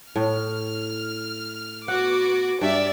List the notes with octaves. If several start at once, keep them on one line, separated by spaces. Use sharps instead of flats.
A2 F6
B3 F#4 F#5 D6
G2 D5 E5